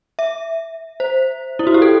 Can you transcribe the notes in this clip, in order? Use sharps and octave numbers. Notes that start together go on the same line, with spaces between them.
E5
C5
E4
F#4
G4
A4